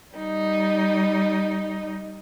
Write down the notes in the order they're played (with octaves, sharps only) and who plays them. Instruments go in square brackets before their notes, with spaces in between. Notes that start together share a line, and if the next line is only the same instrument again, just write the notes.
[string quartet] G3 D#4